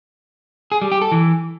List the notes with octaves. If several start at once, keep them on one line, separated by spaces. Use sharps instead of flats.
G#4
G3
G4
A4
E3